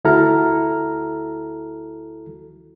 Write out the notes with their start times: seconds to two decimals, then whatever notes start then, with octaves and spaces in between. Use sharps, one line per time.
0.05 D2 E4 F#4 A4 A#5 F6